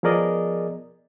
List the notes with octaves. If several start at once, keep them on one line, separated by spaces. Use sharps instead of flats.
F3 B3 G#4 A#4 D5 D#5